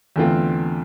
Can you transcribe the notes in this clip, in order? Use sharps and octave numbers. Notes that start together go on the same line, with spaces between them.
E2 D3 A3 C4 F4